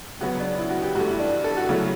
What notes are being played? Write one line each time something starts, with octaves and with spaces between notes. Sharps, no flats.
C#3 F#3 B3 F#4
D4
E4
F#4
G4
G2 E3 A3 F#4
E4
D4
A4
F#4
C#3 F#3 A3 E4